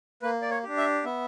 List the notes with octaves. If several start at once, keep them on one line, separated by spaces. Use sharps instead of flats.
A#3 B4
D5
C#5
D4 G4
E5
B3 E5